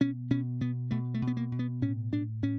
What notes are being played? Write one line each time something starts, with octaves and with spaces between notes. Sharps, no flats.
B2 C#4
B2 C#4
B2 B3
B2 A3
A3
B2
B3
A#3
B2
B3
A2 C#4
A2 D4
A2 C#4